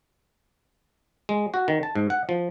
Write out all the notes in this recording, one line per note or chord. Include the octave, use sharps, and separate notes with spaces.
G#3
F#4
D#3
A5
G#2
F#5
F3